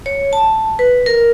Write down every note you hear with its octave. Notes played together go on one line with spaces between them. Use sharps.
C#5
A5
B4
A#4